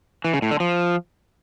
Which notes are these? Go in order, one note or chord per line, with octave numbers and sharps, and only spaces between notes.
E3
C#3
A2
D3
F3